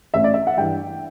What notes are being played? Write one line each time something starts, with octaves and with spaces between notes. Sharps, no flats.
A1 E5
D5
E5
F#5
G2 E3 G5